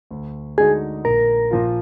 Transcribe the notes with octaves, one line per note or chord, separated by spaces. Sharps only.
D2
D3 G#3 D#4 F#4 G#4
A#1 A#4
A#2 F3 A#3 F4